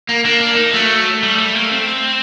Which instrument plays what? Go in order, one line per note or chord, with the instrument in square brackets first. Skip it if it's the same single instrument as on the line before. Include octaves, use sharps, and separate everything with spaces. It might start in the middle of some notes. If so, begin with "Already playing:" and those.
[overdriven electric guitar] A#3
[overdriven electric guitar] A#3 [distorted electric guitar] D4
[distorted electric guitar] D4
D#4
[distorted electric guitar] F#3 [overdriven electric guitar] A3
[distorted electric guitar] G3
G3
A#3
C4